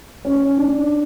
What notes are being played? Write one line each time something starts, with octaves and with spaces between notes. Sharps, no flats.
C#4
D4